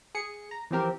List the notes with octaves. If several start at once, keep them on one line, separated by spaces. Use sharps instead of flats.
G#4 C#7
A#5
E3 F3 C4 G4 A#4